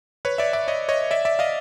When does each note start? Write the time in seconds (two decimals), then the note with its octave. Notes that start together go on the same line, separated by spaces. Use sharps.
0.25 B4 C#5
0.38 D5 E5
0.53 D5 E5
0.68 C#5 D#5
0.89 C#5 D#5
1.11 D5 E5
1.25 D5 E5
1.39 D#5 F5